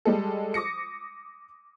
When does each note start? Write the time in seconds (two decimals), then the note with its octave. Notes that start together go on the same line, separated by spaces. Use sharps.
0.05 G3 G#3 A4
0.54 D6 D#6 A#6 C#7